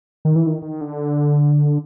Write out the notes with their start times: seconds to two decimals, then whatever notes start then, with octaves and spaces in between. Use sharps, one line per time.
0.25 D#3
0.36 E3
0.47 D#3
0.62 D#3
0.81 D3